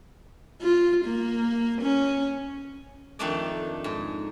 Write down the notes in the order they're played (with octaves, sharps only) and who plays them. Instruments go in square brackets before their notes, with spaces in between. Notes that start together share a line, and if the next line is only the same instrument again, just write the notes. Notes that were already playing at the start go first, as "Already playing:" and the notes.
[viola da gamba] F4
A#3
C#4
[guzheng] F2 D#3 A3 D4 D#4 D5
G#2